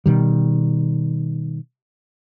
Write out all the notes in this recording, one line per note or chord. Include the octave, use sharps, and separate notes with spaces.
B2 D#3 G3